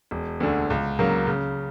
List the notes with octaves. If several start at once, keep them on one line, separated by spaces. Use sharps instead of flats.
E1
D2 D3
C#2
C#3 F#3 A#3
C#3